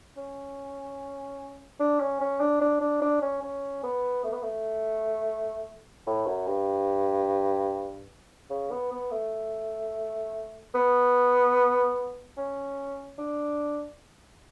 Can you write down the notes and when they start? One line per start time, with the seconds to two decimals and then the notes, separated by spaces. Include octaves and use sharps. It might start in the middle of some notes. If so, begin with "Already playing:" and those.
0.17 C#4
1.80 D4
2.00 C#4
2.21 C#4
2.40 D4
2.61 D4
2.81 D4
3.01 D4
3.22 C#4
3.43 C#4
3.83 B3
4.24 A3
4.33 B3
4.43 A3
6.07 A2
6.27 F#2
6.47 G2
8.50 C#3
8.71 B3
8.92 B3
9.11 A3
10.75 B3
12.37 C#4
13.18 D4